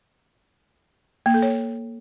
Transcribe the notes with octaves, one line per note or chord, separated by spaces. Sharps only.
A#3
A4
C#5